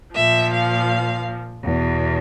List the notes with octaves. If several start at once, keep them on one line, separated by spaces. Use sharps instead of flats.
A#2 F3 E5
F5
E2 B2